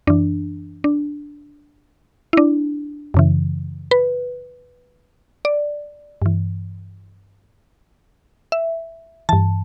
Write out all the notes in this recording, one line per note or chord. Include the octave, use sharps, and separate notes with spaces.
F#2 E3 D4
D4
E4
D4
F#2 C#3 E3
B4
D5
G2 E3
E5
G2 E3 A5